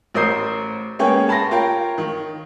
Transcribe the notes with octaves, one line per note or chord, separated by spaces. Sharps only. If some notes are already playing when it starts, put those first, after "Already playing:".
A1 A#4 C5 D#6 G6 C7
G#3 A#3 B3 C#4 C#5 G5
A5 B5 C6 A#6
F4 A#4 C#5 G5
D#3